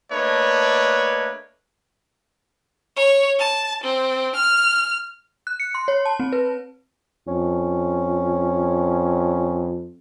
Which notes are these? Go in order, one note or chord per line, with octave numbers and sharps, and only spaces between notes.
A3 A#3 D4 B4 C#5 D#5
C#5
A5
C4
F6
F#6
C#7
C6
C#5
A5
C4
B4
F2 C#4